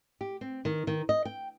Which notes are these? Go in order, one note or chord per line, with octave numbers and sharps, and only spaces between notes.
G4
C4
D#3
D#3
D#5
G5